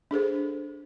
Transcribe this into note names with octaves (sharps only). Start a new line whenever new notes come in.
D4 G#4 A4 C5